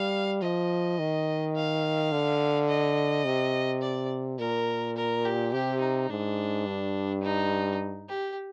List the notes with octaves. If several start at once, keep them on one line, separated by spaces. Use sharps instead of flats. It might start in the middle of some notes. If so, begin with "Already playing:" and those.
Already playing: G3 F5
F3 D#5
D#3
F5
D3
D#5
C3
D5
A#2 A#4
A#4
G4
C3 G4
D#4
G#2 D4
G2
D#4
G4